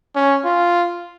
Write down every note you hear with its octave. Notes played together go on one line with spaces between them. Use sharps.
C#4
F4